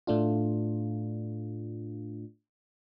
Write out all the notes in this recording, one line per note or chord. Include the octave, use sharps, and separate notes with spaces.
A2 A3 D4 F4